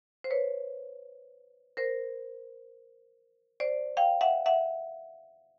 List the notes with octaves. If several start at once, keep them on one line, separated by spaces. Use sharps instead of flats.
C5
B4 C#5
A#4 C5
C5 D5
F5 G5
E5 F#5
E5 F#5